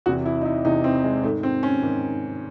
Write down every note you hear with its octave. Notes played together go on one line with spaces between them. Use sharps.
E2 C3 E3 F#4
E4
D#4
E4
E2 C3 E3 D#4
C4
G#3
G#2 D#3 A3
C4
C#4
G#2 D#3